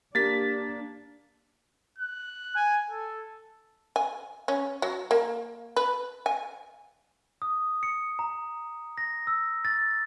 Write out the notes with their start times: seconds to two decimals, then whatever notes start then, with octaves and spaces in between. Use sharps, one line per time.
0.15 A#3 D4 G4 A6 B6
1.98 F#6
2.55 G#5
2.90 A4
3.96 G#5
4.48 C#4
4.82 F#3
5.11 A#3
5.76 B4
6.26 G#5
7.42 D#6
7.83 C#7
8.19 A#5
8.98 A#6
9.27 E6
9.65 A6